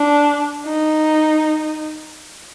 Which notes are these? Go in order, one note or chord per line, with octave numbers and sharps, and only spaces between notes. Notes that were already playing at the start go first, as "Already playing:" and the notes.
Already playing: D4
D#4